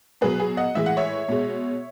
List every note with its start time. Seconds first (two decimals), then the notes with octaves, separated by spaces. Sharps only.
0.21 B2 F#3 G#4 B4
0.40 G#4
0.57 D#5 F#5
0.75 A2 E3 G#3 E5
0.86 F#5
0.97 C#5 E5
1.29 B2 G#3